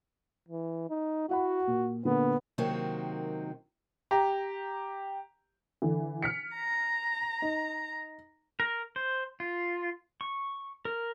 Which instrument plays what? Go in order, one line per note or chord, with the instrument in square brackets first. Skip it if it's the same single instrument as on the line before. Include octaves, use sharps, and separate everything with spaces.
[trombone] E3
D#4
[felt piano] E4 F#5 B5 [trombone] F#4
[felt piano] A#2
[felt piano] A#2 D3 [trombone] B3
[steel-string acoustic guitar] C3 D#3 F#3 A#3 C4
[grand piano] G4 A#5
[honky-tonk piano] D3 E3
F6 B6 C#7
[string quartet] A#5
[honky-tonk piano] D#4
[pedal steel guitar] A#4
C5
F4
C#6
A#4